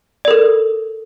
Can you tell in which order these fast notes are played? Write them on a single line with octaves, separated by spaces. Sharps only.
D5 A#4 A4